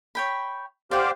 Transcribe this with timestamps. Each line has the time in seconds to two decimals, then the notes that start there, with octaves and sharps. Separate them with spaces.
0.15 C#5 G5 B5
0.91 G4 C5 D5 F5 F#5